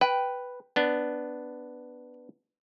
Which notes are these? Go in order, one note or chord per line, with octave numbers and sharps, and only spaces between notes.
B4 G5
B3 D4